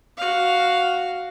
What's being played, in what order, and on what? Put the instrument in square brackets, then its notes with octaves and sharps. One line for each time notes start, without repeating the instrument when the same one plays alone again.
[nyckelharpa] F#4 F5